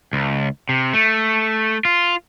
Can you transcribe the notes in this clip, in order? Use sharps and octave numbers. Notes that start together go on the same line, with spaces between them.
C#2
C3
A3
F4